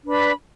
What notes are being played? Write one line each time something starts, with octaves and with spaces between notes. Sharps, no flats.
D4 B4 D5 B5